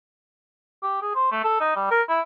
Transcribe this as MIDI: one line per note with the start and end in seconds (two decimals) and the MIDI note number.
0.83 1.01 67
1.02 1.11 68
1.15 1.29 72
1.32 1.44 57
1.44 1.60 69
1.61 1.76 63
1.76 1.87 55
1.91 2.02 70
2.09 2.20 64